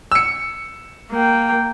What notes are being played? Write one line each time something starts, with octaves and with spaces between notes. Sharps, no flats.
E6 C#7
A#3 G5